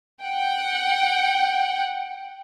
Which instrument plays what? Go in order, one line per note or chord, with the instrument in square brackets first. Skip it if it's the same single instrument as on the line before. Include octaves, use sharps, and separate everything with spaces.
[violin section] F#5 G5